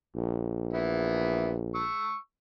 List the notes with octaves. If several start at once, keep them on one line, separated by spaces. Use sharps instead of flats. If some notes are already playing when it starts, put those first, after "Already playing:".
A#1
B3 E4
C#6 E6